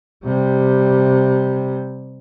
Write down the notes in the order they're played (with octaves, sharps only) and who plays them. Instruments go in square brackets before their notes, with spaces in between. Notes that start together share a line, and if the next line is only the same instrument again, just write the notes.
[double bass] C3 G3